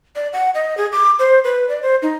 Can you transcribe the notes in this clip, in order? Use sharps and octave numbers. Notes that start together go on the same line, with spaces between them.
D5
F#5
D#5
G#4
D6
C5
B4
D5
C5
D#4